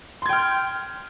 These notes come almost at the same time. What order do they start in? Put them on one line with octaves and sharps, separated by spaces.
C6 G#6 G5 F6 G6